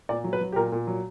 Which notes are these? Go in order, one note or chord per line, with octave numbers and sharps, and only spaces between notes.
A#2 D5
F#3
B4
F#3
G4
A#2 A#4
A#2
F#3